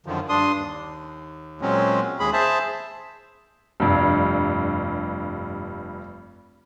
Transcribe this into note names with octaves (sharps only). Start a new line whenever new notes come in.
F#2 D3 D#3 F3
G2 D4 C6 D#6
D#2
A#2 F#3 G#3 C4 C#4
D#2 G#3 G#4 B5
G#4 C5 E5 A5
F1 G2